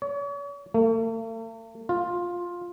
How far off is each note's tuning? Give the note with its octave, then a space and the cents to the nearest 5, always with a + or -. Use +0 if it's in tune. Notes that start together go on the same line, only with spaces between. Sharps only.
C#5 +40
A3 +45
F4 +10